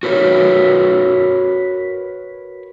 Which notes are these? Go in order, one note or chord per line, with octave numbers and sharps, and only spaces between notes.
F#4 A#4 B4 C#5